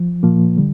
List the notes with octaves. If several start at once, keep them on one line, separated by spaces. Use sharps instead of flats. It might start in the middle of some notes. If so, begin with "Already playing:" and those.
Already playing: F3
A#2 F3 A#3
D3 G3